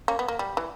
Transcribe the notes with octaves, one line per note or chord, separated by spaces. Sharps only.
A#3 C#4
B3
A#3
G3
E3